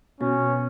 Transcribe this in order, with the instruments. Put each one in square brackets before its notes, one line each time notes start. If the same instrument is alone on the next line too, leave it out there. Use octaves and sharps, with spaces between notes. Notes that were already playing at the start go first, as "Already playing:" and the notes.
[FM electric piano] B2 [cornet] C#4